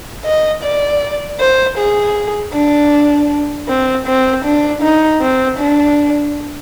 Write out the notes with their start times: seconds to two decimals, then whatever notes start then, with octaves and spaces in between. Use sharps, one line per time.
0.25 D#5
0.63 D5
1.40 C5
1.78 G#4
2.54 D4
3.68 C4
4.07 C4
4.45 D4
4.82 D#4
5.21 C4
5.59 D4